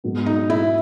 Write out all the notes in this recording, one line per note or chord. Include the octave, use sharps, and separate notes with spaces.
G#2 F#3 B3
D#4
E4